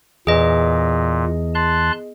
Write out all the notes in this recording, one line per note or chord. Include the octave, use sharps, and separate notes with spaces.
E2 A#2 G#4 D#5
A5 C6 F#6